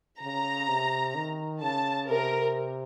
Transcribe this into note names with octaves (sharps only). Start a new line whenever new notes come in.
C#3 A#5
C3
D#3
C#3 A5
C3 A#4